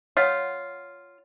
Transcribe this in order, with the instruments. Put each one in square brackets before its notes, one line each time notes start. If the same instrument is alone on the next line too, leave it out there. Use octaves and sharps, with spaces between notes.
[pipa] F4 [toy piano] C#5 F#5 D#6